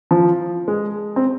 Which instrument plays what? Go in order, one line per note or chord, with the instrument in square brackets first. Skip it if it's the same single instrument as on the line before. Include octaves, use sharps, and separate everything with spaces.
[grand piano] F3
G#3
C4